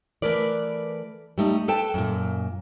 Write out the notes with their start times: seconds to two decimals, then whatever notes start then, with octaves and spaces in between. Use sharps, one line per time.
0.22 E3 G3 A3 A#4 B4 D5
1.38 G3 A3 D#4
1.68 A4 B4 G5 A5
1.94 F#2 A#2